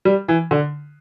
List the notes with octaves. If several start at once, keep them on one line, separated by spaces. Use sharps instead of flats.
G3
E3
D3